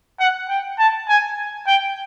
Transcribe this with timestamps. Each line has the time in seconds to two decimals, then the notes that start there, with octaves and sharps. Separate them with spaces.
0.20 F#5
0.49 G5
0.79 A5
1.09 G#5
1.67 G5